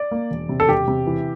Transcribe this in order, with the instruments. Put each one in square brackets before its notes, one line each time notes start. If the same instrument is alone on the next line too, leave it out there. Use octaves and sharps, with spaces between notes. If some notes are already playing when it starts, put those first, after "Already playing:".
Already playing: [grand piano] D5
A#3
E1
C3
A4
E1 G4
C3
E3